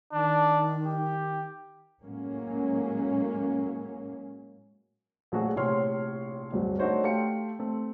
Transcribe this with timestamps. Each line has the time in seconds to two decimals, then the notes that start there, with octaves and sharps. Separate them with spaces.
0.13 D#3 D4
0.86 G4
2.03 A2 F#3 G#3 A#3 C#4
5.32 A#1 F#3 A3 F#4 G#4
5.56 A#1 A2 C3 C#5 C6 F6
6.53 D1 G2 F#3
6.79 A3 D4 D#4 F#4 C5 C#5
7.04 A3 G4 F5 G5 C6 C#7
7.59 A3 C4